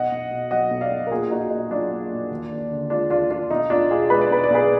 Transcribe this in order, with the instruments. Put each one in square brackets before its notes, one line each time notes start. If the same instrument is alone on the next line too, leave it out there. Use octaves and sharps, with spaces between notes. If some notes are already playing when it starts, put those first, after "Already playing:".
Already playing: [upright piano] B1 D#5 F#5
B1
B2
F#3 D#5 F#5
B1
D5 F5
B1
A#4
A#1 F4 G#4
G#4
A#1 D#4 F#4
A#2 D#4
F#3 D4 F4
A#1
A#1
D#2
D#2
D3
G#3 D4 F4
D#2 D4 F4
D#2 D4 F4
B1 D#4
B1 D4 F4
B2 F4 G#4
G#3 B4
D5
B1 B4
D5
B1 G#4 B4